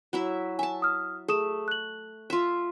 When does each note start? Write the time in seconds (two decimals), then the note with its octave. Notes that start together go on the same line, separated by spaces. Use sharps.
0.13 F#3 E4 E5
0.59 E5 G#5 A5
0.82 D#6 F6
1.28 A3 G#4 D#6 E7
1.68 F#6 F#7
2.30 F4 E5